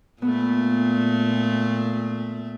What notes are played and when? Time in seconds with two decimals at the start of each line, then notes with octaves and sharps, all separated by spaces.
0.22 A#2 A3 B3